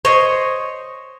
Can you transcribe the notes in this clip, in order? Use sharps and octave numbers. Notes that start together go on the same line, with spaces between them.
C5 C#5 D#5